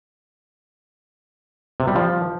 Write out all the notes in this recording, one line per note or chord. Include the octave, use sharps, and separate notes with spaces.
C3
G3
F3